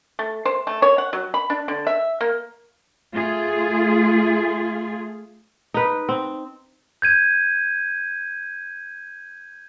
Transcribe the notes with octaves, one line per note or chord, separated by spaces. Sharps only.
A3
C5
A3
C#5
F#5
F#3
B5
D4
D3
E5
A#3
A3 F4 G#4
D#4 B4
C4
G6 G#6 D#7